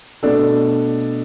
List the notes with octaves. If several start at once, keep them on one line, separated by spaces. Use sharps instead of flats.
B2 A3 D4 A4